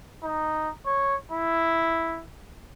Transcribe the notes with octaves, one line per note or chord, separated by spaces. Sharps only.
D#4
C#5
E4